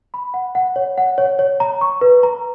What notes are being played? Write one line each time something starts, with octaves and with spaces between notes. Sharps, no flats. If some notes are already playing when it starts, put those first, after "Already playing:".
B5
F#5
F#5
C#5
F#5
C#5
C#5
A#5
C#6
B4
A#5